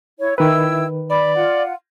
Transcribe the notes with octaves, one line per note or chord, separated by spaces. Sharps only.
E4 C#5
D#3 E4 B4 G5 E6
D5 B5
F4 F#5